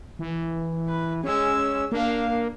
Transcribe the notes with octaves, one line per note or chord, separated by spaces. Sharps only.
E3
B4
G#3 C#4 E6
A#3 D4 F5